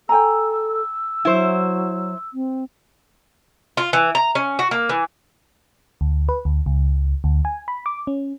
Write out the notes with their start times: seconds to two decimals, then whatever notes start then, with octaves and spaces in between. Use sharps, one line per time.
0.09 A4 G5 G#5 A#5 E6
1.25 F#3 E4 C5
2.34 C4
3.77 F4
3.93 E3
4.15 A#5
4.35 C#4
4.59 F#4
4.71 A#3
4.89 E3
6.01 D2
6.29 B4
6.45 D2
6.66 C#2
7.24 D2
7.45 G#5
7.68 B5
7.86 D6
8.07 C#4